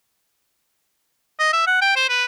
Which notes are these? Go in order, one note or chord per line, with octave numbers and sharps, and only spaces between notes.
D#5
E5
F#5
G5
C5
B4